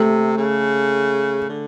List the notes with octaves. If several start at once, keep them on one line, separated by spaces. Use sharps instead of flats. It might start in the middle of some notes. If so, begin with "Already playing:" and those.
Already playing: C3 A3
C#3
D3